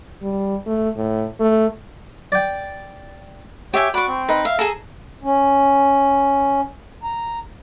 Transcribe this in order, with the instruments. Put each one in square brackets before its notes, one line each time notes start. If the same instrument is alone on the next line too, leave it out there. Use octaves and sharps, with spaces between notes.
[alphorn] G3
A3
A2
A3
[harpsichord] D5 G5
[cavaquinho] G4 E5 G#5 [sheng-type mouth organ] C#5 G5
[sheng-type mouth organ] F#4 D5 [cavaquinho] B5 C#6
[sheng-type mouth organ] C4
[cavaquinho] D#4 B4
[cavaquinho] E5 [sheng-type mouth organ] F5
[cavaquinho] G#4 A#5 [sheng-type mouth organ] A4 E6
[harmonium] C#4
A#5